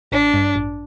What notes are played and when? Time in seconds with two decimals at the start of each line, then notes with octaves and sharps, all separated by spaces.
0.12 A1 D4
0.34 G2
0.56 A1